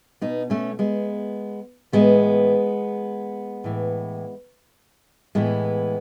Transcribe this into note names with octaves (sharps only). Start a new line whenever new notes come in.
B2 B3 D#4
A3 C#4
G#3 B3
A2 E3 G#3 B3
A2 E3
A2 E3 G#3 B3